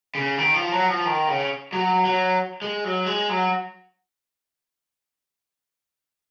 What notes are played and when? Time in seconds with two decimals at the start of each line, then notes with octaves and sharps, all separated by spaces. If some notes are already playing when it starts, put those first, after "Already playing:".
0.15 C#3
0.38 D#3
0.54 F3
0.72 F#3
0.88 F3
1.06 D#3
1.28 C#3
1.73 F#3
2.06 F#3
2.62 G#3
2.84 F#3
3.06 G#3
3.29 F#3